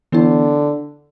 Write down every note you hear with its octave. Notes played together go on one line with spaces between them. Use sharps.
D3 E3 B3 E4